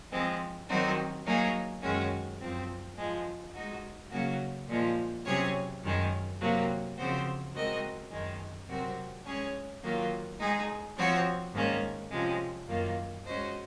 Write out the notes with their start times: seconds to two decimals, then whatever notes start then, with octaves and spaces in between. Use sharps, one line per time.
0.11 F3 G#3 C4
0.69 D#3 F#3 C4 D#4 F#4
1.25 F#3 A#3 D#4 G#4
1.82 F#2 D#3 G#3 C#4 F#4
2.40 F#2 F3 C4
2.97 G#2 F3 G#3
3.53 G#3 D#4 F#4
4.10 C#3 F#3 A#3 C#4 F#4
4.67 A#2 F3 G#3
5.25 C3 F#3 C#4 G#4 C#5
5.83 F#2 D#3 G#3
6.40 C3 F#3 A#3
6.97 C#3 F3 C4 F#4 C5
7.54 G#3 C4 F#4 A#4 D#5
8.10 F#2 D#3 G#3
8.68 C3 F#3 C4 F#4 A#4
9.25 G#3 C#4 G#4 C#5
9.83 D#3 F#3 A#3 F4
10.39 G#3 D#4 G#4
10.96 F3 C4 F#4 C#5
11.53 G#2 D#3 A#3 C#4
12.10 C3 F3 G#3 C#4
12.68 F#2 D#3 A#3 F4
13.26 G#3 C#4 F#4 C5 D#5